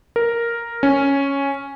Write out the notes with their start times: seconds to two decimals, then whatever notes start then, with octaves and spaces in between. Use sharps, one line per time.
0.16 A#4
0.83 C#4